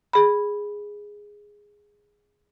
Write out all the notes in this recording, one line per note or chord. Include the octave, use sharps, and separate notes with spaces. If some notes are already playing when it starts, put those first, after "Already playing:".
G#4 B5